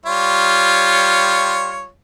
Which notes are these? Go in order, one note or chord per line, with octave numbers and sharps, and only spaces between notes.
G3 F4 C#5